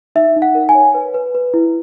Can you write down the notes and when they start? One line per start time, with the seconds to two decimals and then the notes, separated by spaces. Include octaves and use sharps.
0.15 D#4 E5
0.36 D#4
0.42 F#5
0.55 A#4
0.69 G#5
0.75 C#5
0.94 B4
1.14 B4
1.35 B4
1.54 E4